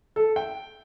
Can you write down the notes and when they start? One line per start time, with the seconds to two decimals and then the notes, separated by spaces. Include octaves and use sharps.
0.16 A4
0.36 G5